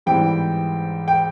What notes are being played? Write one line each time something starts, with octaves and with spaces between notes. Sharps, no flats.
G#2 E3 G3 C4 G5
G5